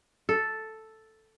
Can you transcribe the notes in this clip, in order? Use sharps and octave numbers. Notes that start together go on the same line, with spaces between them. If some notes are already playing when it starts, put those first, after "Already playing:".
A4